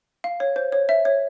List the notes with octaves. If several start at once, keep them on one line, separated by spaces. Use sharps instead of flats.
F5
C#5
C5
C#5
E5
C#5